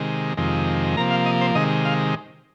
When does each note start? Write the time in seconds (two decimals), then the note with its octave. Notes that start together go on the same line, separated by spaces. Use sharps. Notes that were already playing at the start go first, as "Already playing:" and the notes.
Already playing: C3 D#3 G#3
0.37 F2 C3 D#3 G#3
0.97 C3 F3 A#3 A#5
1.11 F5
1.26 D#5
1.41 C5
1.55 C3 D#3 G#3 D#5
1.85 F5